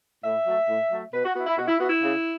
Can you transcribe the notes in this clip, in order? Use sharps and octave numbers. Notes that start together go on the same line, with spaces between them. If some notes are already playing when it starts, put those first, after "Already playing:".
A2 E5
F#3 A3
A2
F#3 A3
B2 B4
F#4
B3 E4 F#4
E4
B2 F#4
E4
B3 E4 F#4
E4
C#3